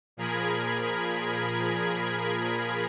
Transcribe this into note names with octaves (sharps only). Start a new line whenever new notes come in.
A#2 F3 G#4 A#4 B5 G#6